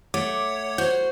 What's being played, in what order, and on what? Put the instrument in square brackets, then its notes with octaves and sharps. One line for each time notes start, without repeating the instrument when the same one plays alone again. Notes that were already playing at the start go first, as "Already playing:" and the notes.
[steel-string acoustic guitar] A3 [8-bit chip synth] C#5 F#5 [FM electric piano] D6
[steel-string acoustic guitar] F#4 [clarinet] C5 [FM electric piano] G6